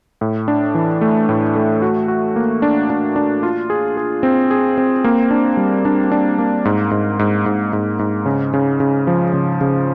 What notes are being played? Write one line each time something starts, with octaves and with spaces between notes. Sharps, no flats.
A2
D4
E3
A3
A2
A3
F#4
F#4
A#3
D4
D4
D4
F4
G#4
G#4
C4
G#4
C4
A#3
D4
G3
D4
D4
A#3
G#2
G#2
G#2
G#2
G#2
G#2
C#3
C#3
C#3
F3
C#3
C#3